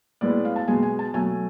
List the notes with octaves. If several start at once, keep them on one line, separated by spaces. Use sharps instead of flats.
A2 G#3 B3 D5
F5
A5
B2 G#3 B3 G#5
G#5
A5
B2 F#3 A3 G#5